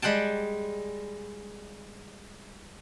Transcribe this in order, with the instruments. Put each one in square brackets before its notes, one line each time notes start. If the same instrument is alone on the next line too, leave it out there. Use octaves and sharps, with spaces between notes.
[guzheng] G3 G#3 F#5 G5 A5